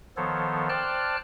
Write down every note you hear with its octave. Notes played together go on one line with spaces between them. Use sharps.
D#3 F3 B3 A4 C5 C#5
C5 D5 G5 A5 F6 F#6